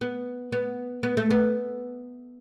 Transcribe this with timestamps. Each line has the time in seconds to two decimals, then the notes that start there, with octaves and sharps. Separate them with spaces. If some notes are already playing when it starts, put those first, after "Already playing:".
0.01 B3
0.52 B3
1.03 B3
1.17 A3
1.30 B3